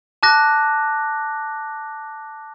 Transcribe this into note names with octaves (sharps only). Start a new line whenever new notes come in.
A5 D6 F#6 A#6